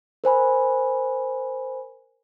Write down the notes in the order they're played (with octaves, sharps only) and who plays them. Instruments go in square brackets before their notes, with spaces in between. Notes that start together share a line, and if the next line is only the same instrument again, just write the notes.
[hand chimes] A#4 C5 G#5 B5